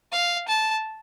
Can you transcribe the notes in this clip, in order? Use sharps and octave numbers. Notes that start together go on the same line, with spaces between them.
F5
A5